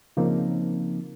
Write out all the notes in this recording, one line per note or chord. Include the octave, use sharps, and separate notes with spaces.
C#3 F3 A#3 C4 D#4